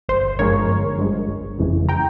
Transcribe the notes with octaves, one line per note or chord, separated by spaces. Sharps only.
G1 C5
G2 F3 G#3 A#4 C#5
G1
G2 F3 G#3
G1
F2 C#3 E3 G#3
G5 A#5